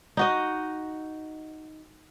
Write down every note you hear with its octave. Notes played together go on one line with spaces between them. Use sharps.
D#4 F#4 D#5